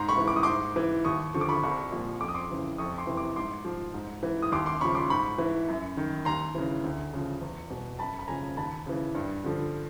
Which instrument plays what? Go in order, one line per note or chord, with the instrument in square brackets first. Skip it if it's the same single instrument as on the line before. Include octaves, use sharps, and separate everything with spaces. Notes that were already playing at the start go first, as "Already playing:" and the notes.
Already playing: [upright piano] G#2 A#5 C6
B5 C#6
E3
D6
D#6
G#2 C6 D6
E3
D#2 C#6 D#6
D3 F3 C#6
D6
B5 C#6
C2 B5 C#6
A#2 F3
F2 D6
D#6
C6 D6
C#3 E3
F2 C#6 D#6
C6 D6
C3 E3
C6 D6
G#2 C6 D6
F3
G#2
E3
D#6
D#2 C6 D6
C6 D6
C#3 F3 B5 C#6
C6 D6
G#2 B5 C#6
E3
F#2
D#3
D#2 A#5 C6
C#3 E3
D2
C#3 F3
E2
B2
F#2 A5 B5
B5
C#3 F3 G#5 A#5
D#2 A5 B5
C#3 E3
G2
D3 F3